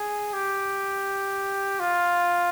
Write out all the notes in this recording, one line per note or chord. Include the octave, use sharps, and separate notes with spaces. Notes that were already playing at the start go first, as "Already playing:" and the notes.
Already playing: G#4
G4
F4